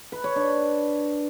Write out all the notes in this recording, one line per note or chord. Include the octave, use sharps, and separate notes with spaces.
B4
C#5
D4